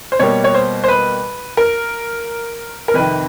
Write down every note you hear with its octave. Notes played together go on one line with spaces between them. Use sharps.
C5
B2 G3 A#3 C#5
C#5
C5
C5
B4
A#4
A#4
F2 C3 D#3 B4